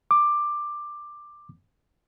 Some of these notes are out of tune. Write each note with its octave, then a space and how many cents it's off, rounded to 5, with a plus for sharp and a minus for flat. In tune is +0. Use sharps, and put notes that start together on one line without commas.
D6 +10